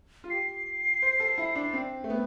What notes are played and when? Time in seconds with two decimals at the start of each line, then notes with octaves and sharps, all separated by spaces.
0.24 F4
0.30 G4 C7
1.02 C5
1.20 A4
1.38 E4
1.55 D4
1.73 C4
2.04 A3
2.10 B3